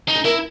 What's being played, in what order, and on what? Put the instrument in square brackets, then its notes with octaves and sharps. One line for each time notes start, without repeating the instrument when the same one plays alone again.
[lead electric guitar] D#4
[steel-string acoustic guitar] G#4
[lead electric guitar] E4 [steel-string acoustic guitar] A#4